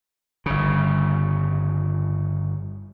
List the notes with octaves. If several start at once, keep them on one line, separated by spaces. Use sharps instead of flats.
G1 C#3